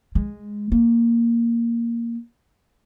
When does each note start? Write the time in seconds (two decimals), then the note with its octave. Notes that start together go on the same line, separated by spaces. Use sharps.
0.15 G#3
0.72 A#3